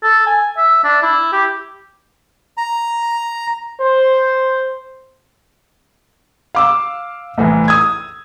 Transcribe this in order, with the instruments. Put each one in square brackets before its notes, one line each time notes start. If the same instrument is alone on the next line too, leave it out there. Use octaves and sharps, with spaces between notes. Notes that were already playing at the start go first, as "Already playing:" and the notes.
[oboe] A4
G#5
E5
D4
E4
G4
[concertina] A#5
[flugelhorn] C5
[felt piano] F5 D6 E6
C2 A2 E3
D#6 E6 G#6